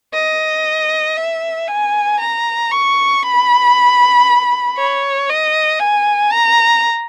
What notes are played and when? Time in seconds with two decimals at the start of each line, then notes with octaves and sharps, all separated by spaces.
0.14 D#5
1.17 E5
1.68 G#5
2.20 A#5
2.72 C#6
3.23 B5
4.77 C#5
5.29 D#5
5.80 G#5
6.32 A#5